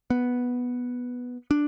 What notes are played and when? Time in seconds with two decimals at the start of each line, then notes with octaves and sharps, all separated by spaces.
0.10 B3
1.51 D4